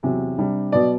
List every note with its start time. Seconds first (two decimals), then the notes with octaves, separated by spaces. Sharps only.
0.03 E2 C3 F#3
0.38 C3 G3 D4
0.72 B2 F#3 B3 D5